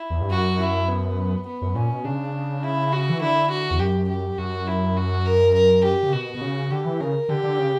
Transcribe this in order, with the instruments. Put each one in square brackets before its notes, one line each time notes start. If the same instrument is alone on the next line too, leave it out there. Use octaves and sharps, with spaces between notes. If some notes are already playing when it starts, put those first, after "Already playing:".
Already playing: [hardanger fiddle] E4
[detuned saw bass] E2
G2
[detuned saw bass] F#2 [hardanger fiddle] F#4
[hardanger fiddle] E4
B3
B3
[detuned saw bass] F#2
[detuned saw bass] A#2 [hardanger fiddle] C#4
[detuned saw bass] B2
[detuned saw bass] C#3 [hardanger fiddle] D4
[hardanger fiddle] E4
F#4
[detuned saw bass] E3
[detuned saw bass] D3 [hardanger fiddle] E4
[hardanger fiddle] F#4
[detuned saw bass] E2
[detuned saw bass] F#2 [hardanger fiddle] G4
[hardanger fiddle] G4
[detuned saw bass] F#2 [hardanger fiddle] F#4
[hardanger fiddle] E4
F#4
A#4
A#4
G4
[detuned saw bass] C#3
[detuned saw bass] B2 [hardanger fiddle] F#4
[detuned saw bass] B2
C#3
[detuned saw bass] D3 [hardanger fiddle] G4
[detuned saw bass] E3
[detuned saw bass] C#3 [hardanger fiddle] A#4
[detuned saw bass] D3 [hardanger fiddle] G4
[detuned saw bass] D3
C#3